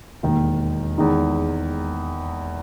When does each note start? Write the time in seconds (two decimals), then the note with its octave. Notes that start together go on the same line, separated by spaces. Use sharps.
0.23 E1 D#2 D#3
0.98 E2 D#3 G#3 D#4